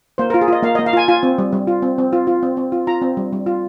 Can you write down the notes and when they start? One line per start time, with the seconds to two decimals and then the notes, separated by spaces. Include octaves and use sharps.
0.18 A#3 C5
0.30 A#4
0.34 F4
0.41 G#4
0.48 F4 D#5
0.63 A#3 F5
0.75 D#5
0.79 A#3
0.86 F5
0.93 F4 G#5
1.08 F4 G#5
1.23 C4
1.38 G3
1.53 G3
1.67 F4
1.82 C4
1.98 C4
2.13 F4
2.27 F4
2.43 C4
2.57 C4
2.72 F4
2.87 F4 A#5
3.02 C4
3.17 G3
3.33 G3
3.46 F4